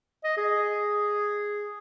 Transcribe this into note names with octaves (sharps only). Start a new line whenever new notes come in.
D#5
G#4